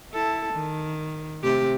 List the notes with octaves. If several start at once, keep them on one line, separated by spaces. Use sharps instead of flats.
E4 A4
D#3
C3 A3 G4